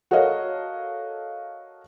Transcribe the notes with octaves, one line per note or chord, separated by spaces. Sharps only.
F#4 A4 A#4 C#5 D#5 F5